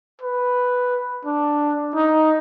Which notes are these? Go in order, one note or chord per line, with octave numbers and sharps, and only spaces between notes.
B4
D4
D#4